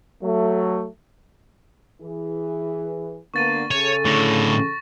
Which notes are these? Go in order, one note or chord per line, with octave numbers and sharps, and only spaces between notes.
F#3 A3
E3 G#4
D3 A#3 B3 C#6 A6 D#7
C#3 A4 C#5
A2 D3 C#6 A#6